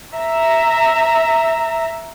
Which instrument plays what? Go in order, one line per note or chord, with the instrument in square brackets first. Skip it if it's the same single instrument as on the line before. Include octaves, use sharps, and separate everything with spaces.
[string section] E5 A#5